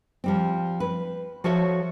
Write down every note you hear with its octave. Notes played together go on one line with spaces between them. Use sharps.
F3 G3 C4
B4
F3 F#4 A4 C#5 E5